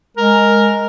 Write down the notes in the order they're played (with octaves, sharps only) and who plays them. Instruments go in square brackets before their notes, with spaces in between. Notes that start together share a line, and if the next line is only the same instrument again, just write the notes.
[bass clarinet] G#3 [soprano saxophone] A#4